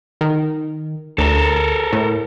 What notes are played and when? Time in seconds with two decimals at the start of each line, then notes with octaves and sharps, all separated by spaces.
0.21 D#3
1.18 D2 A4 A#4
1.93 A2